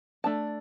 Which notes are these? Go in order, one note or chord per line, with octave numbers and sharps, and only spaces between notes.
A3 D4 A5